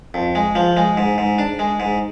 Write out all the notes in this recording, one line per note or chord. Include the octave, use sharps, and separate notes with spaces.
F2
G#3
F3
G#3
G#2
G#2
D4
G#3
G#2